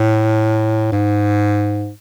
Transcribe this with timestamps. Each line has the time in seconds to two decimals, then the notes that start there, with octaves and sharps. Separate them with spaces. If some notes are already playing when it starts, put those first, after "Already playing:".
Already playing: A2
0.92 G#2